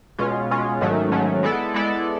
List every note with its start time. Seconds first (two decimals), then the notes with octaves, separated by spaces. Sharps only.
0.19 B2 G#3 C#4 F4
0.51 B2 G#3 C#4 F4
0.81 G#2 D#3 F#3 A3 C#4
1.12 G#2 D#3 F#3 A3 C#4
1.43 G#3 B3 E4 A4 D5
1.74 G#3 B3 E4 A4 D5